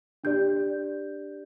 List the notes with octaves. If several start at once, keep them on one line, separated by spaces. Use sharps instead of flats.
D4 G4 D5 G6